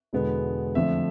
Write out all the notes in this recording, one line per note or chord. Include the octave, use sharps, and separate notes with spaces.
E1 E2 D3 G#3 B3
F2 D3 F3 A3 E5